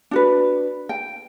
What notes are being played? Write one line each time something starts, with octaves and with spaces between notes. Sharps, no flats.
D4 F#4 B4
G5